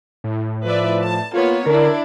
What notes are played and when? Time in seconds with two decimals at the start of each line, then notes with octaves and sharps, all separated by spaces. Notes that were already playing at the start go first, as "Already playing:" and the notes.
0.24 A2
0.65 F3 B4 D5 E5
1.02 A5
1.34 A#3 B3 F4 C#5
1.66 D3 D4 E4 A#4